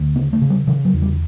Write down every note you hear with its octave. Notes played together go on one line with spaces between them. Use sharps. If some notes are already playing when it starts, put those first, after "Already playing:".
Already playing: D2
C#3 B3
A3
C#3
G3
C#3 E3
F#3
E2
G3